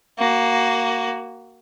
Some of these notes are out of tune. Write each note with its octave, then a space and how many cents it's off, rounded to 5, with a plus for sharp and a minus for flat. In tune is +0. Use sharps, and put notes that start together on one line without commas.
A#3 +0 F#4 +15